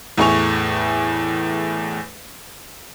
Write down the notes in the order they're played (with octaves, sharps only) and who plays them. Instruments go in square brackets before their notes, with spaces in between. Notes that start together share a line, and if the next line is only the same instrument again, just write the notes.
[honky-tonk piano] E2 A2 G#4 C#6 F7